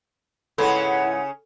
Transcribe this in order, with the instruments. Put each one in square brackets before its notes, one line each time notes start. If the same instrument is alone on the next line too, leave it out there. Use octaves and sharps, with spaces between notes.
[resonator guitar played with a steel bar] G#2 G#3 B4 [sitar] C#3 C#4 [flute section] E4 F#5 [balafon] A4